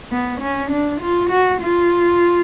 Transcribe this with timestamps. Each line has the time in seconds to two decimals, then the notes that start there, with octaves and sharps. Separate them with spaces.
0.11 B3
0.41 C#4
0.71 D4
1.01 F4
1.30 F#4
1.61 F4